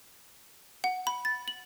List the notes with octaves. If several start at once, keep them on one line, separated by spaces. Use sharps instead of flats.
F#5
B5
A6
F#7